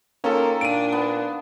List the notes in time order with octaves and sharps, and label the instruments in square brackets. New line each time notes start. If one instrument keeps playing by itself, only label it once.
[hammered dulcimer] D#3 F4 [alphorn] A#3 [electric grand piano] C#4 A4
[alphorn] A#2 [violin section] D4 [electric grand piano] D7 D#7
[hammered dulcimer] B3